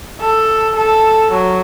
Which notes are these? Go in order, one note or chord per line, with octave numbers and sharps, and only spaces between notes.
A4
A4
F#3